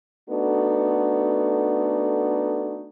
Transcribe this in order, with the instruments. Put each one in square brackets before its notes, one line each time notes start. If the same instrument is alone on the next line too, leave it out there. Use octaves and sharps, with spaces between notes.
[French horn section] A3 B3 D4 D#4 F#4 A4